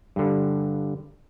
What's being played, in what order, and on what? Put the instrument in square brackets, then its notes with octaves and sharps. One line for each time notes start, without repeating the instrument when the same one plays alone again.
[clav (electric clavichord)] G2 D3